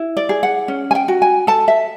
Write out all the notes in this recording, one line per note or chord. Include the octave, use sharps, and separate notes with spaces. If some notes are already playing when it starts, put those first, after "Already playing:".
Already playing: E4
D5
G#4
F#5
C#4
G#5
G5
F#4
G#5
A4 A5
E5